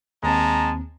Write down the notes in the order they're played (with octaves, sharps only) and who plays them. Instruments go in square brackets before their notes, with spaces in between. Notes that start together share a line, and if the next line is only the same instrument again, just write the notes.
[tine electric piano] D#2 C4 [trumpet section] G#3 A5 A#5